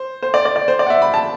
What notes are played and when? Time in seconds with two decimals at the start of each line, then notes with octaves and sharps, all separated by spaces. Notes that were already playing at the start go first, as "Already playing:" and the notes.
Already playing: C5
0.22 C5
0.34 D5
0.45 D5
0.56 D5
0.68 C5
0.79 D5
0.86 F#5
0.90 E5
1.02 B5
1.14 A5